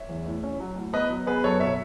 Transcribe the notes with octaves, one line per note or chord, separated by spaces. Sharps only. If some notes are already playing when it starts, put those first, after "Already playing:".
Already playing: C#5 E5
E2
A2
C#4
F#3
A2
B3 B4 D#5
F#3
B3 G#4 B4
F#2 A4 C#5
B2 C#5 E5